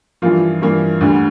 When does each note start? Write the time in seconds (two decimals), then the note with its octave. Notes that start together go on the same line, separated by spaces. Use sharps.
0.22 G2 E3 F3 A#3 F4
0.62 G2 E3 A#3
1.01 D2 D3 G3